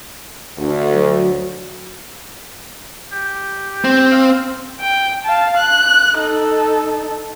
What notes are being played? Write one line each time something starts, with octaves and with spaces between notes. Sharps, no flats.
D2
F#3
G4
C4
F5
G5
F5 A5
F#6
D#4 A4